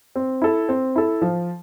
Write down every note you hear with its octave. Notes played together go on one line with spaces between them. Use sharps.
C4
E4 A4
C4
E4 A4
F3